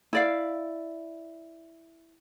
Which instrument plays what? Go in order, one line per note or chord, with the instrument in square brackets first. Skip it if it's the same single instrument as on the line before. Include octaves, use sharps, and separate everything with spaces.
[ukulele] E4 D5 F5